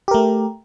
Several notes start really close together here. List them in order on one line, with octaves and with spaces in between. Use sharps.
G4 A#4 A3